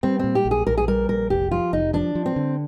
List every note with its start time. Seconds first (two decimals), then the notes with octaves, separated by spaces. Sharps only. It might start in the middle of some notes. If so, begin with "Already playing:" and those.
0.03 G3 C4
0.19 A#2 C4
0.35 G4
0.45 A#1
0.51 G#4
0.67 A#1 A#4
0.78 G#4
0.88 G3 A#4
1.09 A#1 A#4
1.30 F1 G4
1.51 F3 F4
1.73 F1 D#4
1.93 F3 D4
2.15 F3
2.26 C4
2.36 D3